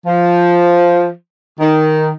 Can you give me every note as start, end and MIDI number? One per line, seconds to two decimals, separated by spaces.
0.05 1.09 53
1.60 2.11 51